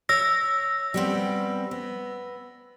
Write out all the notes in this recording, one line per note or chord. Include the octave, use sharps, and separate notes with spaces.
C#5 E5 E6 A#6
G3 B3 C4
B3